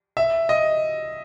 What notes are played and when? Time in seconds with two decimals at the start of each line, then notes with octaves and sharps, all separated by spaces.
0.17 E5
0.49 D#5